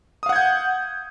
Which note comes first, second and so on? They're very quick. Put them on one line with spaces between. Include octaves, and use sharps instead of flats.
D#6 F5 F#5 G#6 G6